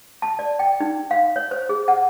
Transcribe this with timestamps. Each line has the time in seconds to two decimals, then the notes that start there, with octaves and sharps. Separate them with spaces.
0.22 A5
0.39 D5
0.59 G5
0.80 D#4
1.11 F5
1.36 C#5
1.51 C5
1.69 G#4
1.88 F#5